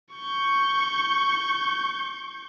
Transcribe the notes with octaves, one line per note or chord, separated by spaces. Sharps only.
C#6 G6